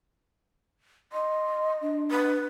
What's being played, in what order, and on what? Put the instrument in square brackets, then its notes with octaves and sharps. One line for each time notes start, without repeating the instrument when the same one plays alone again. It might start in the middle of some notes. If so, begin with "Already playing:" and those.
[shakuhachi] D#5 [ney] C6
[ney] D4
[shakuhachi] B4